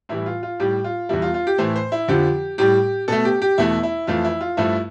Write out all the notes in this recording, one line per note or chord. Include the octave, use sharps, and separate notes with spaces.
A2 E3 G3 E4
F4
F4
A2 G3 G4
F4
E2 B2 G3 E4
F4
F4
G4
A2 E3 A3 C5
C5
E4
F2 D3 F3 G4
A2 G3 G4
B2 A3 A4
G4
G4
E2 B2 A3 E4
E4
F2 E3 A3 F4
E4
F4
G2 F3 A3 E4